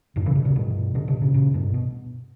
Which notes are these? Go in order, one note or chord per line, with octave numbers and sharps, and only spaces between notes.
F#2 A#2
C#3 E3
B2 D3
A#2 C#3
G2 B2
B2 D3
B2 D3
A#2 C#3
A#2 C#3
G2 B2
B2